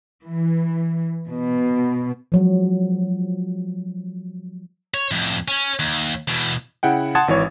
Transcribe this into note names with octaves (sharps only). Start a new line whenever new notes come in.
E3
B2
F3 F#3 G#3
C#5
F2 A2
C#4
D#2
E2 B2
C#3 E4 F#5 G5
F#5 A5 C6 D#6 G#6 A6
G#1 E3 C#5